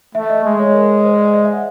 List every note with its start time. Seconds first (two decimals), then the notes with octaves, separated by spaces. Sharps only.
0.15 A3 E5
0.30 D#5
0.44 G#3 D#5
0.59 C#5
0.74 A#4
1.04 C5
1.19 D5
1.33 D#5
1.44 E5
1.53 F#5